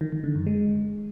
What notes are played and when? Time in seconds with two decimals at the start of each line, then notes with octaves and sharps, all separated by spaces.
0.01 D#3
0.12 D#3
0.24 D3
0.35 F#2
0.47 G#3